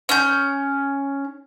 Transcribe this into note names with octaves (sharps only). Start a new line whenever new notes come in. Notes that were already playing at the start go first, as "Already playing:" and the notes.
C#4 G6